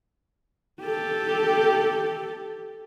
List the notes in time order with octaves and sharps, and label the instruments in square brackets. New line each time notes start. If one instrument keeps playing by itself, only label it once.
[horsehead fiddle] G4 A4